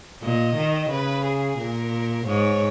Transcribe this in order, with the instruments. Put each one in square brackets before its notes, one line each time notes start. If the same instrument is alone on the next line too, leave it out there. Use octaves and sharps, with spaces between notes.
[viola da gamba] A#2 [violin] D#5
[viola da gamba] D#3
[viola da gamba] C#3 [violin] B4
[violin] G#4
[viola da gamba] A#2 [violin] A#4
[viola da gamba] G#2 [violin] C#5